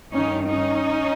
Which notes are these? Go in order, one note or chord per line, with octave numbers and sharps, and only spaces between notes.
G2 D#3 C#4 D#4
C#4 D#4